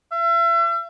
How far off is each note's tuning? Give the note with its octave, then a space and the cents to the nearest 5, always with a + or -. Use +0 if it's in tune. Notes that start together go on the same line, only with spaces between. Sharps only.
E5 +40